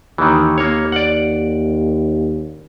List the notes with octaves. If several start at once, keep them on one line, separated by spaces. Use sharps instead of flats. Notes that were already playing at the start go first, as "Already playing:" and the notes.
D#2 D#3 E3
A#3 C#5
D5 F#5